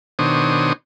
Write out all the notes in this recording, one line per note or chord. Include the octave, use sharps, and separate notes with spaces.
B2 D#3 D4 C5 C#5 D#6